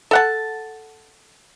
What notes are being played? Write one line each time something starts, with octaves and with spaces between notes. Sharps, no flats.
A4 F#5 A5